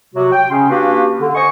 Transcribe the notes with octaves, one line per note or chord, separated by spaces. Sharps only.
C3 F#3 F#4
G5
C#3 C#4 C6
A#3 D4 F#4 G4 B4 F5
D3
C5 D#5 G#5 C#6